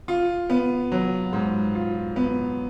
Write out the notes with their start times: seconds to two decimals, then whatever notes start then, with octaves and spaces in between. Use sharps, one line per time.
0.08 F4
0.50 B3
0.92 F#3
1.33 G#2
1.75 F4
2.16 B3